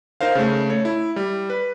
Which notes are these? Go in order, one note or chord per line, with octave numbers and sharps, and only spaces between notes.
D#4 A#4 C5 F5
C#3 A3
A3 C#5
E4
G3
B4